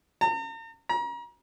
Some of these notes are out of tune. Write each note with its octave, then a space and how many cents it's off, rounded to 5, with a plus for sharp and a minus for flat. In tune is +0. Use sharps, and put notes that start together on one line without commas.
A#5 -45
A#5 +35